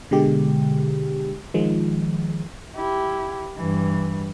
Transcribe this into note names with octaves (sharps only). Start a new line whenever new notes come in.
B2 D3 G#3 G4
D#3 F3 G#3
E4 G4
G2 E3